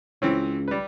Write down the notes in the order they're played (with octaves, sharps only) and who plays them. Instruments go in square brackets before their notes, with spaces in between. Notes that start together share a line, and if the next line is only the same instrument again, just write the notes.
[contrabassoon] C#2 [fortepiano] E3 C4 C#4
[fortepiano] G3 B4